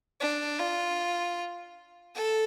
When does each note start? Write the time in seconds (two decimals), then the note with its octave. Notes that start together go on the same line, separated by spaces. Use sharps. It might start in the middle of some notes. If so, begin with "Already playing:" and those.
0.20 D4
0.59 F4
2.15 A4